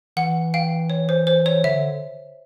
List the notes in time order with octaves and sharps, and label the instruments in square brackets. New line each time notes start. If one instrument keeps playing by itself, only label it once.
[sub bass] E3 [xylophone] F#5
[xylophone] F5 G5
C#5
C5
C5
C#5
[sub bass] D3 [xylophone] E5